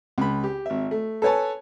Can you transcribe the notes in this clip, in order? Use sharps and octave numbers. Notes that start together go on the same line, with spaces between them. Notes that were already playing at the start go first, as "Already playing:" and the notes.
C#2 B5
G4
G#1 E5
A3
A4 B4 C#5 G#5 A5